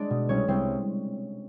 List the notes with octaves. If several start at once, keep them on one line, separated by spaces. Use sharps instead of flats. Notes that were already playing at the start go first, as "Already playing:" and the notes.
Already playing: G#3 D4 D5
B2
C2 C#4 C#5
C2 C4 C5